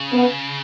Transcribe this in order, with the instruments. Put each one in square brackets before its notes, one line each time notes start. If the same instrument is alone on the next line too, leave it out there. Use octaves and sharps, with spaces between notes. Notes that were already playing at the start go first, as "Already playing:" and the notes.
Already playing: [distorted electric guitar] C#3
[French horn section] B3